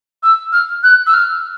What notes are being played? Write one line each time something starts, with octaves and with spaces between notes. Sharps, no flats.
E6
F6
F#6
E6
F6